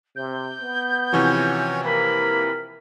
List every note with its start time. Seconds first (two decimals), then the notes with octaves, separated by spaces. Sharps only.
0.16 C3 G6
0.62 B3
1.13 C3 E3 F3 C#4 F#4 C#5
1.84 A#3 A#4 B5